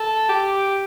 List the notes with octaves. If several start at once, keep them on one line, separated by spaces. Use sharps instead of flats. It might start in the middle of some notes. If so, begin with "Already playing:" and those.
Already playing: A4
G4